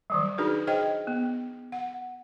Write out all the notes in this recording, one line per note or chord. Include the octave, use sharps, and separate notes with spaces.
D#3 F#3 G3
D4 D#4 F#4 G#4 B4
G#4 C5 D#5 G5
B3
F#5